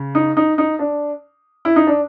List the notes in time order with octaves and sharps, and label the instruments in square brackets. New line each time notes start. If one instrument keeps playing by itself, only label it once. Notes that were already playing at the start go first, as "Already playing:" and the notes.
Already playing: [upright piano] C#3
D#4
D#4
D#4
D4
E4
D#4
D4